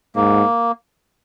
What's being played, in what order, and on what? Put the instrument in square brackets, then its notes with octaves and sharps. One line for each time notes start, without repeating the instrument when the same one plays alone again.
[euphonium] G#2 [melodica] A#3